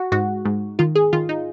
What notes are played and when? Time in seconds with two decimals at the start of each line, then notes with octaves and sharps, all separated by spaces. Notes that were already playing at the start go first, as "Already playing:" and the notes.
Already playing: F#4
0.12 G#2 F#4
0.45 G#2
0.79 D#3 F4
0.95 G#4
1.13 D#3 F4
1.29 D#4